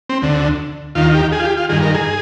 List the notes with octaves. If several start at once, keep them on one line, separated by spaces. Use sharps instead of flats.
C4
D2 D3
D#2 D#3 F4
G4
G#4
F4
G4
F4
G2 D#3 G#4
A#4
G#4